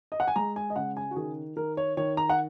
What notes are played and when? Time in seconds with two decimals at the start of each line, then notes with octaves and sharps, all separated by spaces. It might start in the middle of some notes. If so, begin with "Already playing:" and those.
0.12 D#5
0.20 F#5
0.28 G#5
0.36 G#3 A#5
0.56 G#5
0.70 D#5
0.76 C#3 F#5
0.97 G#5
1.11 F#4
1.16 D#3 G#4
1.56 D#3 A#4
1.77 C#5
1.97 D#3 C#5
2.17 A#5
2.30 F#5